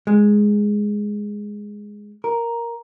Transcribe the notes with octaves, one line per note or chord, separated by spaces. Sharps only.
G#3
A#4